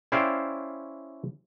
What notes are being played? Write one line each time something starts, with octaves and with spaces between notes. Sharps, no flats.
C#4 E4 C5 D5 F5 G5